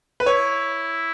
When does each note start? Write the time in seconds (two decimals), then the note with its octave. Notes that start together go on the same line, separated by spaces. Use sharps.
0.20 B4
0.26 E4 C#5